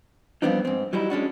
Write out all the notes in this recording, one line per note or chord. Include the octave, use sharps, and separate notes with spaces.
F3 G3 B3 C4 D4 D#4
G#2 C4
F#3 G3 D#4 E4
G#3 C#4 D4 F#4